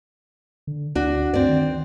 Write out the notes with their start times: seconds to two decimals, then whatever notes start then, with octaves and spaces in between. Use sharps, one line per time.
0.67 D3
0.95 D2 D4 F#4
1.34 G2 C4 D5
1.48 D#3